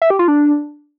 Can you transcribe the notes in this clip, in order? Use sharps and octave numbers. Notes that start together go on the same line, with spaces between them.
E5
G4
F4
D4